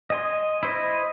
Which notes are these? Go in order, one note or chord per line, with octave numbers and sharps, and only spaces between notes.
D#5 G#5 C6
E4 C5 D#5